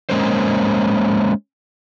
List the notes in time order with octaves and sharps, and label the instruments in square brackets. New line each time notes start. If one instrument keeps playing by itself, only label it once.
[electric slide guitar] G#3 A#3 C#4 C5